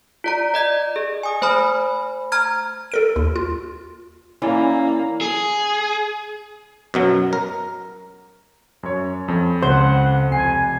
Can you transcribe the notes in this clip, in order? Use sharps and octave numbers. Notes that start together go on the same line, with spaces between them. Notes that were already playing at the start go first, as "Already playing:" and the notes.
F4 D5 A#5
D5 D#5 G#6
G#4
G#5 D#6
A3 C5 G#5 B5 F6
A#5 F6 G#6
A4 A#4 D7
D#2
F4
E3 A#3 C#4 D5
G#4
F#2 B2 F#3
A#4
F#2 C#5
F2
C#2 C5 F#5
F1 G#5 C7